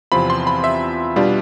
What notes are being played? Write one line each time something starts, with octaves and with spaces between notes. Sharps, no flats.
E2 C3 F3 C4 F4 B5
C6
B5
E5
B2 G3 D4 F4